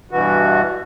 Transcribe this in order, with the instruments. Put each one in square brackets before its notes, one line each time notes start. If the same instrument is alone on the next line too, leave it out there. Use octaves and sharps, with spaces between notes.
[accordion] G2 B2 E3 F#4